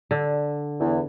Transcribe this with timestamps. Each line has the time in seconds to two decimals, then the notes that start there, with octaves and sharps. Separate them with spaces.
0.11 D3
0.80 E2